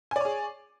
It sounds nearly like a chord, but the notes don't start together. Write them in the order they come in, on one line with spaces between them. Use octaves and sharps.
G#5 D5 C#5 G#4